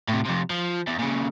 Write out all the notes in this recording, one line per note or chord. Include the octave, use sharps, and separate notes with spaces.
A2 C3
F2 C3
F3
E2
A#2 C#3